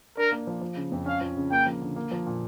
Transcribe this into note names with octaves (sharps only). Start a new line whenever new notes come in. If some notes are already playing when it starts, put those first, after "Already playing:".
D4 A#4
A#3
F3
F3
C#3
F2
C#4 F5
F3
C#3
A#3 G5
F3
D3
A#3
F3
A#2